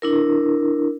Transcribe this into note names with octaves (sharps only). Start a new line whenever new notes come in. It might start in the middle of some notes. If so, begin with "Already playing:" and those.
D4 E4 A#4